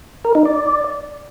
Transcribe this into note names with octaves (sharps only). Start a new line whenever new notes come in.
A#4
D#4
D5